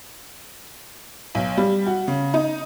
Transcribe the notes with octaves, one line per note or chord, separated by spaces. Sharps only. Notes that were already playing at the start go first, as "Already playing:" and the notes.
B1
G3
F#4
C#3
D#4